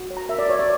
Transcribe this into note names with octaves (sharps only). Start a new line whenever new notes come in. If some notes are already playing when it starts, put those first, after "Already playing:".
Already playing: F#4
C#5
A#5
A#4 E5
D5
F#4 C#5
D5